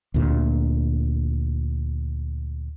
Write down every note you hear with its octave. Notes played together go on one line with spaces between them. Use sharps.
D2 A#2 D3